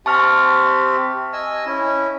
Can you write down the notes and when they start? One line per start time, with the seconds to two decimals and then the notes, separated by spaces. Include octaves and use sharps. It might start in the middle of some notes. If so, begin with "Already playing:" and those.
0.06 C4 G4 E5 A5 C#6 F6
1.33 D#5 G#5 E6
1.66 C#4 E4